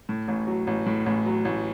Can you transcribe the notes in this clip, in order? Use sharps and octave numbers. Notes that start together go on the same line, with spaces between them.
A2
A1
F#3
A1
A2
A1
F#3
A1